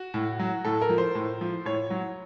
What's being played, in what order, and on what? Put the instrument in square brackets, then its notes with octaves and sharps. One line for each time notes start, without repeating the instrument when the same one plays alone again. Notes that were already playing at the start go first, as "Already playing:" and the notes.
Already playing: [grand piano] F#4
A2
F#3
A2 A4
A#4
F3
C5
A2
F3
A2 C#5
F#3